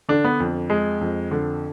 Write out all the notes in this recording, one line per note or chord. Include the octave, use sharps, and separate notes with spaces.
D3 D4
B3
F2
G#3
F2
D3